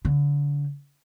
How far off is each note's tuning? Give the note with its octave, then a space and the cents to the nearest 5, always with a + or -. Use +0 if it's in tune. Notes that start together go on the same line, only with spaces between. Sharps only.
D3 -35